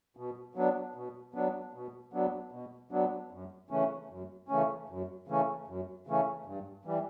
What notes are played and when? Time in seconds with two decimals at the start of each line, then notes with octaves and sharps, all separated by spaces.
0.17 B2
0.55 F#3 B3 D4
0.95 B2
1.34 F#3 B3 D4
1.73 B2
2.13 F#3 B3 D4
2.52 B2
2.91 F#3 B3 D4
3.31 F#2
3.70 C#3 E3 A3 C#4
4.09 F#2
4.48 C#3 E3 A3 C#4
4.89 F#2
5.28 C#3 E3 A3 C#4
5.67 F#2
6.07 C#3 E3 A3 C#4
6.46 G2
6.85 E3 G3